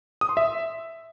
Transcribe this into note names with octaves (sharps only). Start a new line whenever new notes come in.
D#6
C6
E5